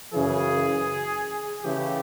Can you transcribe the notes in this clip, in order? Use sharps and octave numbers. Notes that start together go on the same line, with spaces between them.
F#2 C#3 E3 G#4
C#3 E3 A3 G4